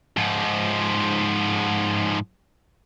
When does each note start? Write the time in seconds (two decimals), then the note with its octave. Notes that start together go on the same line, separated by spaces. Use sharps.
0.17 G#2 F3